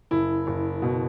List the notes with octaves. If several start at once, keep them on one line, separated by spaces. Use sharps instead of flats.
F#1 E4
F#1
B2